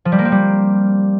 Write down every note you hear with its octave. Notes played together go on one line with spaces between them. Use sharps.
F3
G3
A#3
C4
G3